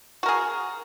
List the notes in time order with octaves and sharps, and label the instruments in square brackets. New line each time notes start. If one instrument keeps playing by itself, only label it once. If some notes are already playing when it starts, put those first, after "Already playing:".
[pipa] F#4
A#4
G#4